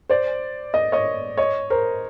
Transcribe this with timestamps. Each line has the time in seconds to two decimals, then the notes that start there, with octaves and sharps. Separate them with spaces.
0.10 C5 D5
0.74 D#5
0.92 C#5 D#5
1.37 C#5 D#5
1.70 A#4 C5